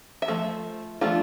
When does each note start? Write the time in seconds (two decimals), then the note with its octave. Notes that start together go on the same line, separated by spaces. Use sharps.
0.22 E5
0.28 F3 A3
1.01 F3 A3 D4 F4